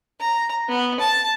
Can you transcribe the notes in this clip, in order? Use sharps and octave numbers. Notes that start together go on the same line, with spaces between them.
A#5
B3
A5